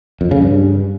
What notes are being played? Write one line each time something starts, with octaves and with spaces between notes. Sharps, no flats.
F2
C#3
G2